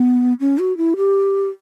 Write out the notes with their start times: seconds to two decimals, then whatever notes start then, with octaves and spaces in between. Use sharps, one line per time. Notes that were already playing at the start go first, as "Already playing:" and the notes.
Already playing: B3
0.40 C#4
0.59 F#4
0.77 E4
0.97 G4